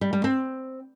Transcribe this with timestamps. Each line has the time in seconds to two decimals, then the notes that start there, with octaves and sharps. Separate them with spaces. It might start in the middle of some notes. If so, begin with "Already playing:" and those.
0.01 G3
0.13 G3
0.24 C4